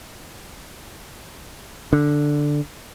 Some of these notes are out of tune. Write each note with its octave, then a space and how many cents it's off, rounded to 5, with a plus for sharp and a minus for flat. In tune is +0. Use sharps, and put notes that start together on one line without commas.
D3 +0